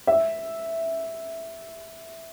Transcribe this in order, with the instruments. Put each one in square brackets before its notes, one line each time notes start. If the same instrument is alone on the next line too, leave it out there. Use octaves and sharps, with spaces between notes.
[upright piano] E5